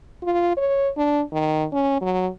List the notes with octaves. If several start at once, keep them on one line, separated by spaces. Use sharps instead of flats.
F4
C#5
D4
D#3
C#4
F#3